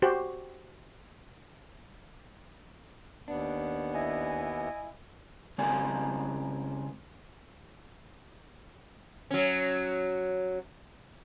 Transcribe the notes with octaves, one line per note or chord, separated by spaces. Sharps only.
F#4 G4 C5
D#2 B3 D4
E4 D#5 G#5
C#3 G#3 C4 D5 G#5
F#3 C#4